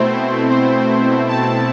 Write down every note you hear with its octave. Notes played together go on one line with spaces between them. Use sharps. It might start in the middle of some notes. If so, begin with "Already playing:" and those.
Already playing: B2 A3 C4 E4 C5
C5
A5